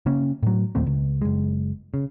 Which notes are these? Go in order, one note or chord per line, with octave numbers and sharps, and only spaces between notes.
C#3 A#3 C#4
A2 F#3
D#2 A#2 A3 C4
C#2
F#1 G#3
C#3